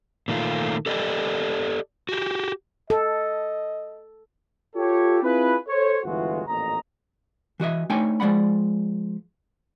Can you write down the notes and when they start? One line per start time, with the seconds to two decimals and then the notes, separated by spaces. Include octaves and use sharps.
0.28 A#2 D#3 A3 F4
0.86 G4 A4 D5 D#5
2.09 F#4 G4
2.90 A4 D#5
4.76 F4 G4 A4 C#5
5.23 C4 E4 F4 G#4 B4
5.67 A4 C5 C#5
6.04 G1 D2 E3 G#3 F4 F#4
6.47 A1 F2 A#2 D#5 A#5
7.60 E3 F#4 D#5 E5
7.90 A3 D4 D#4 C#5 G5 G#5
8.20 F3 G#3 D5 F#5 B5